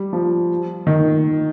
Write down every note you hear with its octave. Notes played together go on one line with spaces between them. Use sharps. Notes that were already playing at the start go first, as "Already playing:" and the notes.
Already playing: G3
F3
D#3